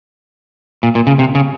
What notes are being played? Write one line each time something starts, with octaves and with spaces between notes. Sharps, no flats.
A#2
A#2
C#3
C3
C#3